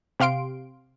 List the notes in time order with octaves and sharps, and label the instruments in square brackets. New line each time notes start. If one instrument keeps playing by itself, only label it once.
[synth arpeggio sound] C3 G4 F5 C6 D7